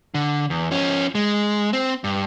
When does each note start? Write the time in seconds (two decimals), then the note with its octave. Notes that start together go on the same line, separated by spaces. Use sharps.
0.14 D3
0.50 E2
0.71 F3 C#4
1.15 G#3
1.73 C4
2.04 G2